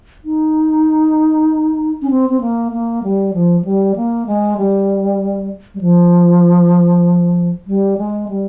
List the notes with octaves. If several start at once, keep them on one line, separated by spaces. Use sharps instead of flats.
D#4
C#4
C4
C4
A#3
A#3
G3
F3
F3
G3
A#3
G#3
G3
G3
F3
G3
G#3
G3